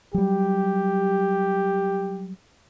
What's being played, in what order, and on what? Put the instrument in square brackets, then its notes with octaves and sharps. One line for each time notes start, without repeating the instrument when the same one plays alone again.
[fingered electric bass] F#3 G3 [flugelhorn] G4